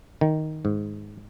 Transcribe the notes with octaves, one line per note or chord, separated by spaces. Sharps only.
D#3
G#2